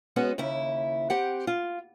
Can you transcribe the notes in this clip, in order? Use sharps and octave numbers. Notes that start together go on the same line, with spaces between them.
G#3 B3 C#4 F#4
D#2 C#3 E4
C4 G4 F#5
F4